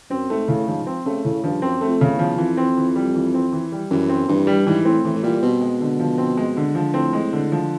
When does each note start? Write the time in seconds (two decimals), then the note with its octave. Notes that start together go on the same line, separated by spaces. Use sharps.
0.10 F#2 C4
0.30 G#2 A3
0.48 A2 C#3
0.67 G#2 F3
0.87 C4
1.05 C#3 A3
1.25 A2 C#3
1.44 G2 F3
1.62 F#2 C4
1.81 A3
1.88 F2
2.01 C#3
2.14 E2
2.19 F3
2.38 F2 E3
2.57 C4
2.77 E3
2.96 G3
3.15 E3
3.34 C4
3.52 E3
3.72 G3
3.91 F#2 E3
4.09 C4
4.28 G2 E3
4.47 G3
4.67 G#2 E3
4.85 A2 C4
5.04 A2 E3
5.15 A2
5.23 A#2 G3
5.42 B2 C4
5.61 G#3
5.81 D3
5.99 F3
6.18 C4
6.37 G#3
6.57 D3
6.75 F3
6.94 A2 C4
7.13 G#3
7.33 D3
7.52 F3